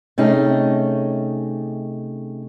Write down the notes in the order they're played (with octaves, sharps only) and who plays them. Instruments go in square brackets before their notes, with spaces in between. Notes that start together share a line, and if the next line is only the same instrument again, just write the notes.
[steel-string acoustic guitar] C3 A3 C#4 D#4 G#4